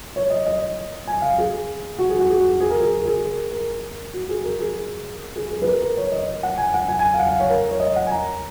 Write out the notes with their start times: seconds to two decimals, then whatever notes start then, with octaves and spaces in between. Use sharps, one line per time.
0.16 C#5
0.30 D#5
0.47 D#5
1.07 G#5
1.22 F5
1.38 G#4
1.99 F#4
2.09 G#4
2.19 F#4
2.30 G#4
2.60 G#4
2.70 A#4
2.81 G#4
3.01 A#4
3.06 G#4
3.52 A#4
4.14 F#4
4.29 G#4
4.44 A#4
4.59 G#4
5.36 G#4
5.52 G#4
5.62 B4
5.66 A#4
5.82 A#4
5.97 C#5
6.12 D#5
6.43 F#5
6.58 G#5
6.74 F#5
6.88 G#5
6.99 G#5
7.14 F5
7.19 F#5
7.29 F5
7.40 C#5
7.50 A#4
7.71 C#5
7.80 D#5
7.96 F#5
8.07 G#5
8.12 A#5